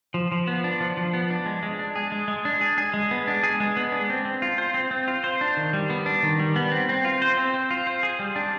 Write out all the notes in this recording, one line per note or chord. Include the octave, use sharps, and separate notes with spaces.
F3
F3
B3
D4
F3
F3
B3
D4
G#3
G#3
D4
G#4
G#3
G#3
D4
G#4
G#4
G#3
B3
D4
G#4
G#3
B3
D4
C4
C4
F4
C5
C4
C4
F4
C5
D4
D#3
G3
B3
D4
D#3
G3
B3
C4
C4
F4
C5
C4
C4
F4
C5
G#4
G3
D4